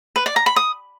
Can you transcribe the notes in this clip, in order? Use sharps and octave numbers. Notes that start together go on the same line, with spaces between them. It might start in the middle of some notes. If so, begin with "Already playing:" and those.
B4
D5
A#5
B5
D#6